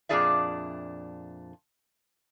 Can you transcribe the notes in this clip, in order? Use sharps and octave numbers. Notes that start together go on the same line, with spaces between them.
F2 A#2 D4 G#4 D5 E5